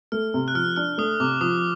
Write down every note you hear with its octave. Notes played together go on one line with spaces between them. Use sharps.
A3 F6
C3
F#6
F3 F6
D4 F6
A3 D#6
C3 D6
F3 D#6